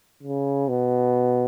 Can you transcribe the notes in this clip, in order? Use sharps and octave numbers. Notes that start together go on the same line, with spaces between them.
C#3
B2